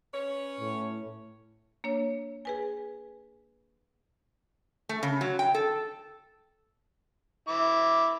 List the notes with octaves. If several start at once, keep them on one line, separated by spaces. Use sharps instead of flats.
C#4 B4 C#5
A2
A#3 D4 C#5
G#4 B4 G#5
A3
C#3
F#3
G5
A4
E4 D6